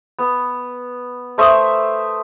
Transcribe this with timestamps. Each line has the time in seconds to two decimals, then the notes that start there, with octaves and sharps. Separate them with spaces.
0.19 B3
1.38 A3 C5 E5 D#6